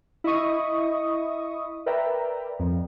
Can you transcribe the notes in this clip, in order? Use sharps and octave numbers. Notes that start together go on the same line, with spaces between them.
E4 D#5 E5 C#6 D#6
A#4 B4 D5 E5 G5 A#5
F2